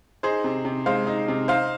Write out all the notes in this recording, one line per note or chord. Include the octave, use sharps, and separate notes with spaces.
D#4 G#4 C5
C3
C3
G#3 C5 F5
D#4
C3
D#4 C5 F5